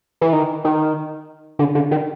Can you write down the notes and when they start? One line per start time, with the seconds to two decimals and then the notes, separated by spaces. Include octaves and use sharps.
0.21 E3
0.33 D#3
0.64 D#3
1.59 D3
1.75 D3
1.91 D#3